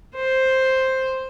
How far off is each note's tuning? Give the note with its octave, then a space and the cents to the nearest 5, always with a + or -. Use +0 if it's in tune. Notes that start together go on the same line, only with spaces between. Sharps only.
C5 +5